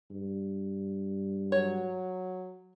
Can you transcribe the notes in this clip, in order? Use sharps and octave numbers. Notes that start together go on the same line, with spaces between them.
G2
F#3 C#5